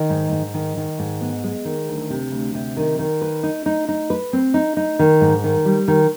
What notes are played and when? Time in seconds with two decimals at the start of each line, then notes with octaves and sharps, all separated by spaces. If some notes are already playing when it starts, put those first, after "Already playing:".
Already playing: D#3
0.09 G#2
0.31 G#2
0.54 D#3
0.77 D#3
0.99 G#2
1.21 B3
1.44 G#3
1.65 D#3
1.88 D2
2.10 C3
2.32 D2
2.54 C3
2.77 D#3
2.99 D#3
3.21 B4
3.43 D#4
3.66 D#4
3.89 D#4
4.10 B4
4.33 C4
4.54 D#4
4.77 D#4
4.99 D#3
5.21 G#2
5.44 D#3
5.65 G3
5.88 D#3